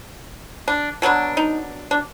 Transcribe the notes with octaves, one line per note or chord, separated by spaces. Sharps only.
D4
B2 F#3 B3 D4
D#4
D4